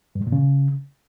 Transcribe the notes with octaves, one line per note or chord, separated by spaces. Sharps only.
G2
G#2
A#2
C#3